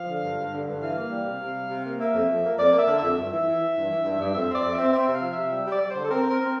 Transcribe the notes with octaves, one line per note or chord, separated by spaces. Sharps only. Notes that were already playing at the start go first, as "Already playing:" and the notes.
Already playing: F3 F5
D3
G2
G2
D3
G2
E3 F5
A#3
G3
C3
C3
G3
C3
A#3
A#3 E5
F2
F2
A#3
F2 D5
A#3
E5
D3
F2 E5
G2 E5
E3
E3
E3
G2
E3
G2
G2
F2 E5
C4 D5
F2
E5
C4
C4 E5
C3 F5
F3
E5
C3
G3 E5
G3 D5
G3
D3 C5
A4
C4 A#4
C4 A#4
C4